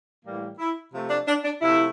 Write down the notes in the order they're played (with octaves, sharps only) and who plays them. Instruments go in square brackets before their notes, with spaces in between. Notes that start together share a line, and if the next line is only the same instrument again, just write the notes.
[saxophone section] A2 E3 G3 A#3
E4
C3 F3 A3
D4
D4
D4
C3 F3 A3 E4